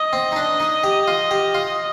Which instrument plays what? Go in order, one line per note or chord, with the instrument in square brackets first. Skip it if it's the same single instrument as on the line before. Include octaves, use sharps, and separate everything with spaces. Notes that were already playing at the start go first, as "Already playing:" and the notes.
Already playing: [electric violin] D#5
[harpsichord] C4
D#4
D4
D#4
G4
F4
G4
F4